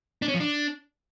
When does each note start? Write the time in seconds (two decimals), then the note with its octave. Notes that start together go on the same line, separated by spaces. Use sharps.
0.22 D4
0.28 C#4
0.34 F3
0.40 D4